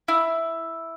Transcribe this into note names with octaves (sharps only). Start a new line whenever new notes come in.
E4